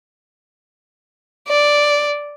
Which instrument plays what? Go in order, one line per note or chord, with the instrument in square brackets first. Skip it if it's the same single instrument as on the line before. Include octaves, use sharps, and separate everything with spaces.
[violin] D5